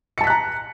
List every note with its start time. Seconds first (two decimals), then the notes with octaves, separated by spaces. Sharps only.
0.18 C#7
0.21 A5
0.24 B6
0.27 F#6
0.30 A#5